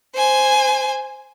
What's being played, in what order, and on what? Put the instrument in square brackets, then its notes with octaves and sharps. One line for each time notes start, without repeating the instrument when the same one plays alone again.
[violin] C5 G#5